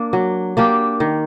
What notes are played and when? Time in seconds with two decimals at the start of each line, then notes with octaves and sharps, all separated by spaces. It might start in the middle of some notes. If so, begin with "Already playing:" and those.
Already playing: A#3 D4
0.13 F#3
0.57 A#3 D4 G4
1.00 D#3